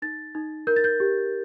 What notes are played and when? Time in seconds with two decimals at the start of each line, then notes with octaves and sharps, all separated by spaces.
0.02 D#4 A6
0.35 D#4
0.67 A#4 G6
0.76 A6
0.84 G6
1.00 G4